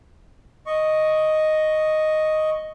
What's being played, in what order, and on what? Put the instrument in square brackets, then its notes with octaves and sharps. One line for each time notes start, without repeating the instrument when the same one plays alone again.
[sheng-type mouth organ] D#5 C#6